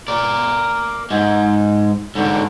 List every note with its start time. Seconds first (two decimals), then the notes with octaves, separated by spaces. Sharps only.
0.08 A#4 D5
1.10 G#2 G#3
2.15 G#2 D3